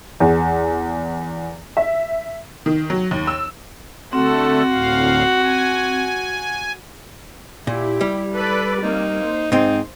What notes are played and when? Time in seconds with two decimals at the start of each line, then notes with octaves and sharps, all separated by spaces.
0.20 E2
1.77 E5
2.66 D#3
2.90 F#3
3.11 D#2
3.27 E6
4.13 D3 A3 C4 F#4 A4
4.70 D2 A2 F5
5.43 G#5
7.67 A#2 E4 G4
8.01 G3
8.36 A4 B4 D5
8.83 A#3 C4 D#4
9.21 C5
9.52 G#2 C4 D#4